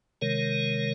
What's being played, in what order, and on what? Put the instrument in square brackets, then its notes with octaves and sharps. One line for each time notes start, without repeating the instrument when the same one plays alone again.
[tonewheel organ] C3 D#3 G#3 A#4 C#5